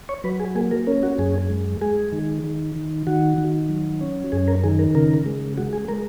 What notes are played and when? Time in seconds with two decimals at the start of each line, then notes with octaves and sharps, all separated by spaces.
0.09 C#5
0.24 F#3 B4
0.40 G#4
0.55 A#3 G#4
0.71 A#4
0.87 C#4 A#4
1.03 F#4
1.18 F#2 G#4
1.50 G#3
1.81 G#3 G#4
2.12 D#3
2.44 D#3
2.76 D#3
3.07 D#3 F#4
3.38 D#3
3.69 F#3
4.01 C#4
4.32 F#2 G#4
4.48 A#4
4.63 D#3 G#4
4.79 A#4
4.95 C#3 A#4
5.26 G#3
5.57 G#3 F#4
5.73 G#4
5.88 G#3 A#4